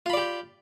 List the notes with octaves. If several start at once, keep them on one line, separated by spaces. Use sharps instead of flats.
F4 G4 D5 B5